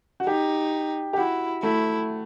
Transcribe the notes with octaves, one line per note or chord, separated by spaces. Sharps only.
F#4
D#4 G4
G4
E4 F#4
A3 E4